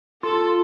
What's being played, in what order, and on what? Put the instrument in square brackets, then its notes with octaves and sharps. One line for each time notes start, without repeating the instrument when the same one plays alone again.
[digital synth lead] F4 [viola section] A4